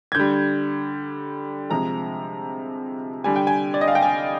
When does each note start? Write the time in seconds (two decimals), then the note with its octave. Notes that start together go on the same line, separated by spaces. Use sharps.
0.12 G#6
0.15 D3 G3 G6
1.70 C3 F3 G#3 A#5
3.24 D3 G3 G#5
3.36 G5
3.47 G#5
3.74 D5
3.81 D#5
3.88 F5
3.95 G5
4.02 G#5